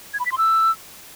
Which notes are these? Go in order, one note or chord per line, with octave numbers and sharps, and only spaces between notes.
G#6
B5
B6
C6
E6